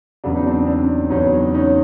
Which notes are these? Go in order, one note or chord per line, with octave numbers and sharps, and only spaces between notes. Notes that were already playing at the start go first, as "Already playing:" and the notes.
E2 C#3 F#3 D4
D#4
C4 D4
C4 D4
E2 C#3 F#3 C#4 D#4
C#4 D#4